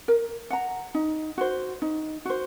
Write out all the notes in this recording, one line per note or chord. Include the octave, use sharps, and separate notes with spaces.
A#4
F#5 A#5
D#4
F#4 C5
D#4
F#4 C5